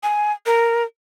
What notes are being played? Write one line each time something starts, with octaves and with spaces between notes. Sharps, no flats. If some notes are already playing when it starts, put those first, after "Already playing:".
G#5
A#4